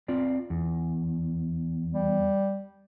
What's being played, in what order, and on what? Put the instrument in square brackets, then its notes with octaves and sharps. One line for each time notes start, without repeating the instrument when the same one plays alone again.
[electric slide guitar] C4 F4 D5
E2
[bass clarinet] G3